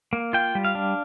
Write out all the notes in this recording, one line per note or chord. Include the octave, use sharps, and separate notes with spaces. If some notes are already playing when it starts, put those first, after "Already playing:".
A#3
F4 G5
G3
F5
D4